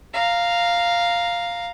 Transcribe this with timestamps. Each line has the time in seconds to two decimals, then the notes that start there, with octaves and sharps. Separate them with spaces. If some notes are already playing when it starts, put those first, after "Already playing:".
0.14 F5 A#5